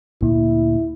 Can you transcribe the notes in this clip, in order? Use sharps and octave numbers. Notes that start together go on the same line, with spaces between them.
D2 A#2 A#3 E4